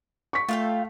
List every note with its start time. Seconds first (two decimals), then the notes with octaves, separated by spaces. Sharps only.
0.33 C#6 B6
0.49 A3 F4 F5 G5